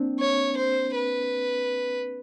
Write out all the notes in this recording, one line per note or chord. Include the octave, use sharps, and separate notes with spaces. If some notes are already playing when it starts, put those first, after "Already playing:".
Already playing: A#3 C4 D4
C#5
C5
B4